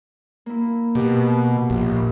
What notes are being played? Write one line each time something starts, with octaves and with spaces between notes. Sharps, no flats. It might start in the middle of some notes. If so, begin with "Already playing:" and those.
A#3 E4
B2 G4
A#1